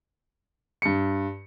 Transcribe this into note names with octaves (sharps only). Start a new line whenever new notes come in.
G2 C#7